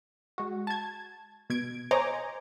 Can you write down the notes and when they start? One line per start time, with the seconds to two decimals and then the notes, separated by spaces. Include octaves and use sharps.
0.38 G#3 F#4
0.67 A5 G#6
1.50 B2 G#6 D7
1.91 C5 C#5 D#5 G#5 A#5 D6